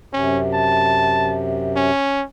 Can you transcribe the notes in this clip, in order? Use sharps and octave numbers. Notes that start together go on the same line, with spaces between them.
F#2 C3 C#4
A5
C#4